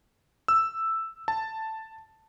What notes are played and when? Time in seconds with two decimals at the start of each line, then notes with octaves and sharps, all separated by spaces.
0.48 E6
1.28 A5